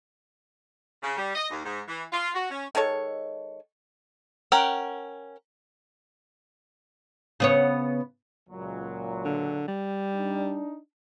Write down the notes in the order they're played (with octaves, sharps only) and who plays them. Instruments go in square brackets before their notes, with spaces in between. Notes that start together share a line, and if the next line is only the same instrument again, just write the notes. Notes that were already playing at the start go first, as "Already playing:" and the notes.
[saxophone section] C#3
G3
D#5
D#2
G#2
E3
F4
F#4
C#4
[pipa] D#3 G#3 A4 C#5
[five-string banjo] C#4 A#4 F#5 G5
[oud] C#3 B3 C#5
[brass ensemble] C#2 A#2 F#3
[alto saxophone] D3
G3
[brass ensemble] D4 D#4